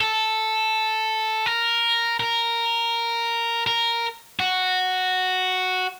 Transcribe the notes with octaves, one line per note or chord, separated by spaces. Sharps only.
A4
A#4
A#4
A#4
F#4